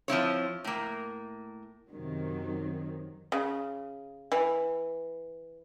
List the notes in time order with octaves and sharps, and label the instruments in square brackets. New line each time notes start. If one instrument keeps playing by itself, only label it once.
[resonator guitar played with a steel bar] F3 C4 E4 C#5
A2 A#3
[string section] F#2 C3 D#3 F#3
[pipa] C#3
E3